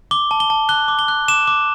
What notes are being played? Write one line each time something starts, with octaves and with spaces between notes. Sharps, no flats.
D6 G7
A5
G7
A5
F#6 G7
D6
G7
F#6
D6 E7
D6